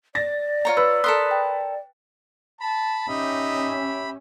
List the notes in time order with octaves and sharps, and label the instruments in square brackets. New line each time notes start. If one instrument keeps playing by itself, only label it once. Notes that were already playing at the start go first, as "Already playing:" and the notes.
[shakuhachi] D5 [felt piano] A6 A#6
[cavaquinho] F4 C#5 A#5
[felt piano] B4 [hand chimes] E6
[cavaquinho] A4 A#4 C6 [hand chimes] D#6 F#6 B6
[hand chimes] G5
[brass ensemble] A5 [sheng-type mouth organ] B5
[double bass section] C#4 [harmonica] D#4 [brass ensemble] G4 E5